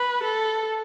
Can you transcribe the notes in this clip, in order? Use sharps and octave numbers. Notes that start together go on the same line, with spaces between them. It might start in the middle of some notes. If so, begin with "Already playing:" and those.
Already playing: B4
A4